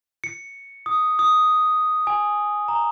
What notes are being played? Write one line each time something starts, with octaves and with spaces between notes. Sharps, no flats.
C#7
D#6
D#6
G#5
A#5